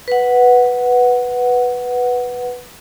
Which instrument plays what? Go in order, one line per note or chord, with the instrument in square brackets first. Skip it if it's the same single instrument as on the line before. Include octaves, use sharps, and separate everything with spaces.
[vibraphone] B4 F#5